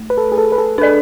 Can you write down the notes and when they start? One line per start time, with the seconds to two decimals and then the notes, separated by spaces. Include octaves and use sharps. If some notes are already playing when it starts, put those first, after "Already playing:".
Already playing: A3
0.10 B4
0.18 A4
0.32 G#4
0.38 A4
0.52 B4
0.58 A4
0.78 D4 A4 B4 D5